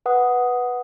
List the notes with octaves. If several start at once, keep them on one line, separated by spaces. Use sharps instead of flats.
B4 F#5 D#6